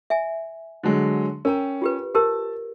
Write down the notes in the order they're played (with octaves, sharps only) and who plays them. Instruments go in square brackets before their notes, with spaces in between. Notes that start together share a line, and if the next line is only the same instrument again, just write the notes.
[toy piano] E5 G#5
[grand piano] D3 F#3 G#3
[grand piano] C#4 G5 [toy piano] A#4 A#5
[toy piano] F4 G4 B4
[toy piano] G4 A#4 C5 [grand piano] A5